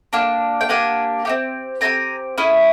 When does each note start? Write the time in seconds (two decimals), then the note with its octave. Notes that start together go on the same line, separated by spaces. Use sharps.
0.13 A#3 D4 G4
0.61 G5
0.69 A#3 D4 G4 F#5 G#5
1.25 C4 D#4 G4
1.81 C4 D#4 G4 G#5 A#5
2.38 C#4 E4 G#4